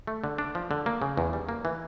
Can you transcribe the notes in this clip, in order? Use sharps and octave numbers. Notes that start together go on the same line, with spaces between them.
A3
D3
D4
F3
D3
A#3
C#3
E2
G3
A#3
E3